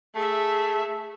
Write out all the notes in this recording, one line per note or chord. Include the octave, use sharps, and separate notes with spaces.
A3 G#4 E5